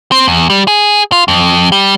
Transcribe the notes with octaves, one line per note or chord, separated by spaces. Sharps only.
C4
E2
G3
G#4
F4
F2
G3